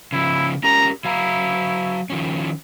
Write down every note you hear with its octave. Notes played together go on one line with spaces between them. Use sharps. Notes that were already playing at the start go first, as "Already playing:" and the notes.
C#3 F3 E4
C#4 G4 A#4 A#5
F#3 E4 F5 A#5
D#3 F3 C#4